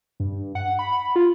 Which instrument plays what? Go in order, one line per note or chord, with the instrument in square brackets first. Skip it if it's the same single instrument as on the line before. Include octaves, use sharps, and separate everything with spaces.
[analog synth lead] G2
F#5
B5
F4